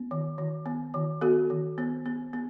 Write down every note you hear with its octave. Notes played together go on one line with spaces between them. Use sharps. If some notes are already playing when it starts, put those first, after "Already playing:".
Already playing: B3
D#3
D#3
B3
D#3
B3 F#4 A4
D#3
B3
B3
B3